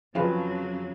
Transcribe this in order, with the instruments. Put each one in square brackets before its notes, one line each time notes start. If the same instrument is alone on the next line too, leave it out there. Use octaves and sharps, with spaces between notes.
[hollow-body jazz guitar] F2 F3 [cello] C#3 F#3 [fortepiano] F4 G#4 B4